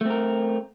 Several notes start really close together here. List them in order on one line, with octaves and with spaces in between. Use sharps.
A3 C4 A#4